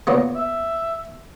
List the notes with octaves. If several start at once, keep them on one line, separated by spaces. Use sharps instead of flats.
A#2 C#3 B3
E5